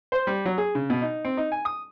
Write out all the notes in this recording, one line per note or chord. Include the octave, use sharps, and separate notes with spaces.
C5
G3
F#3
G#4
C#3
B2
D#4
C4
D#4
G#5
D#6